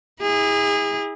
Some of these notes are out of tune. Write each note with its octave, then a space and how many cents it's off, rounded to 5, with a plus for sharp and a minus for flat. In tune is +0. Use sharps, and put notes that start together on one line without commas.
E4 -35 G#4 -30